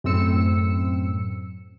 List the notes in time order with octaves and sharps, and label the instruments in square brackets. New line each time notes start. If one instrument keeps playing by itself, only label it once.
[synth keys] F#2 A2 C4 E6 C#7